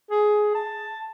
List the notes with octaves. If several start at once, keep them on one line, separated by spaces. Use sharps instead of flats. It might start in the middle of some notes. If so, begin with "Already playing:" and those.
G#4
A5